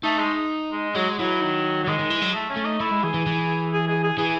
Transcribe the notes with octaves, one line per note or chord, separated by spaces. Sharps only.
A3 D#4
G#3
G#3
F#3 G#3
E3 F#3
D#3
F#3
D#3 G#3
D#3
E3
F#3
A3
C#4
A3
D#4
A3 E4
G#3
E3 G#4
E3
E3
G#4
G#4
G#4
E3 G#4